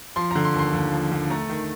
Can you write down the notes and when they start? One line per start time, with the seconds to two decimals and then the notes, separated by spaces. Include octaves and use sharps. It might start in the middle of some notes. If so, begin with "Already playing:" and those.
0.16 F3 C6
0.31 D3 A#5
0.45 C6
0.54 D#2
0.59 C6
0.73 D#2
0.92 F3
1.12 D3
1.30 A3 A#5
1.49 D#3